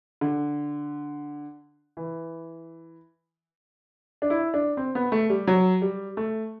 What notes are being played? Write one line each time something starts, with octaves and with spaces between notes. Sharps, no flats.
D3
E3
D4
E4
D4
C4
B3
A3
G3
F#3
G3
A3